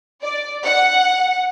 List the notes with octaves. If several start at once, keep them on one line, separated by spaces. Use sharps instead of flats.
D5
F#5